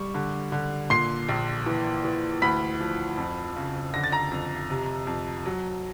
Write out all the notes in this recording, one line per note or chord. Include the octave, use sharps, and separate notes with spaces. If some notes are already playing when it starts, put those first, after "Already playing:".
Already playing: G3 C#6
D3
D3
A#2 C6 C7
A#1
E3
E3
D2 B5 B6
F3
F2
C#3
D3 A#6
A6
A#5 A#6
F2
C3
F2
F#3